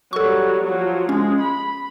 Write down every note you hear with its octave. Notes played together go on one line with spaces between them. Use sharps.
F#3 G3 A4 C#6
F3 F#3
G#3 C#4
B5